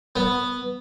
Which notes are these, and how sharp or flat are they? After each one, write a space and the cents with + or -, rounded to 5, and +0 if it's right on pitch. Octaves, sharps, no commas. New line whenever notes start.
B3 +0